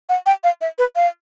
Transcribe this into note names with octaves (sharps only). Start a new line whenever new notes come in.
F#5
G5
F5
E5
B4
F5